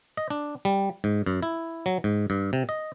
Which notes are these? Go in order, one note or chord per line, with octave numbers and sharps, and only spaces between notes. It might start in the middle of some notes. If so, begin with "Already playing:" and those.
D#5
D4
G3
G#2
F#2
E4
F#3
G#2
G2
C3
D#5